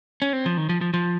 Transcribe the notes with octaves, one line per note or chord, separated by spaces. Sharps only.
C#4
C4
F3
D#3
F3
F3
F3